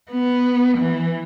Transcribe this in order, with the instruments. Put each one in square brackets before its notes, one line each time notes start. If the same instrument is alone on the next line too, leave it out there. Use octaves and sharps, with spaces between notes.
[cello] B3
E3